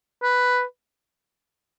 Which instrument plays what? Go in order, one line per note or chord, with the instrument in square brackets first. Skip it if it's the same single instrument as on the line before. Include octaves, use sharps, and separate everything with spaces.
[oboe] B4